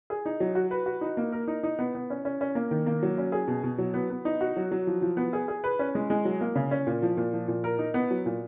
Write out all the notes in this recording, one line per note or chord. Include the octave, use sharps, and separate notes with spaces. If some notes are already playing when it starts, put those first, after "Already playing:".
G#4
D#4
F#3
F#4
B4
F#4
D#4
A#3
A#4
D#4
D#4
B3
B3
C#4
C#4
C#4
A#3
D#3
A#3
F#3
C#4
G#4
B2
B2
F#3
B3
B3
D#4
F#4
F#3
F#3
F3
F3
B3
G#4
G#4
B4
C#4
G#3
G#3
F#3
A#3
C#3
C#4
A#2
F3
A#2
F3
A#2
A#4
D#4
B3
F#3
A#2